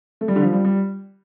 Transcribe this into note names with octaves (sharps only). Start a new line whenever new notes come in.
A3
G3
D3
F3
G3
G3